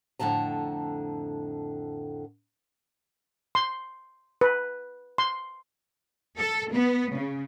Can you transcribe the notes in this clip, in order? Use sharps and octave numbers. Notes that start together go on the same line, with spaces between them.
F2 A2 D3 A5 A#5
C6
B4
C6
A4
B3
C#3